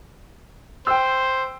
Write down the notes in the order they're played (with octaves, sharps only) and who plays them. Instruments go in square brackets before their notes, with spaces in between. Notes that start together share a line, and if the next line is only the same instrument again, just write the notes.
[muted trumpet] C5 [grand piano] G5 E6